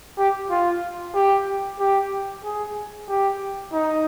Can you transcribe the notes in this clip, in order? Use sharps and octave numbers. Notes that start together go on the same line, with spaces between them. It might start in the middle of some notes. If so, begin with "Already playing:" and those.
G4
F4
G4
G4
G#4
G4
D#4